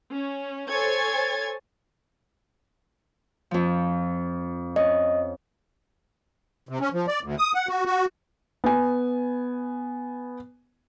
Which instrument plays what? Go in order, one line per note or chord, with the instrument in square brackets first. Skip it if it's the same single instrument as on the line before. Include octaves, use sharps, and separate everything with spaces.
[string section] C#4
A4 C5 C#5 G#5 G#6 A6
[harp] F2 F3
[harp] C#4 [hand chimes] D#5
[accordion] C3
C#4
F3
D5
D2
D#6
F#5
F#4
F#4
[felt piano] B3 G#5